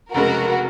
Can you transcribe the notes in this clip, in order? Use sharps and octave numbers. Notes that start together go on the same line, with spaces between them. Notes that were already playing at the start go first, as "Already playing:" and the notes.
F1 F2 C#3 G#3 F#4 A#4